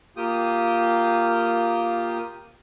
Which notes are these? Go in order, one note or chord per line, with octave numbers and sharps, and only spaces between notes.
A#3 F4 G4 G5 D#6